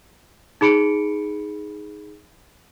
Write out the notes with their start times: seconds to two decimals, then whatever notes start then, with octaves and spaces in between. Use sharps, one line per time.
0.61 D#4 G#4 B5 C#7 D7